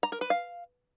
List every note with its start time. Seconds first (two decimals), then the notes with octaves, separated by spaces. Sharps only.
0.03 A#5
0.12 A#4
0.21 B4
0.30 F5